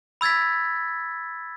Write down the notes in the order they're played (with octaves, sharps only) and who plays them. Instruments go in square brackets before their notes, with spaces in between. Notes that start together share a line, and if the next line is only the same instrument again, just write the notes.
[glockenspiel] B5 E6 G#6 A6 B6